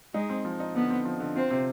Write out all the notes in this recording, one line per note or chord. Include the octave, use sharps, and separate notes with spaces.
G#3 D#4
C4
F3
D#4
D3 B3
C4
F3
D3
C4 F4
C3